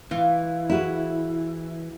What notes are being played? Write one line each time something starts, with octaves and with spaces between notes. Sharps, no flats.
E3 F4
E4 F#4 G#4